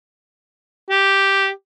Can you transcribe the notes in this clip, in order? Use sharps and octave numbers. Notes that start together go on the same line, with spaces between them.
G4